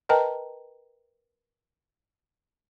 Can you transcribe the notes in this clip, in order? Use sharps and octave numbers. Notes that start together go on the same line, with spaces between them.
A#4 B4 D#5 G5 A5 A#5